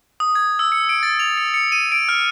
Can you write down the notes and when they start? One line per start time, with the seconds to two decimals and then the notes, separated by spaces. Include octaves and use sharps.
0.20 D#6
0.35 G#6
0.59 E6
0.72 C#7
0.89 D7
1.03 A6
1.20 F7
1.38 C#7
1.54 C#7
1.72 D#7
1.92 D7
2.09 F6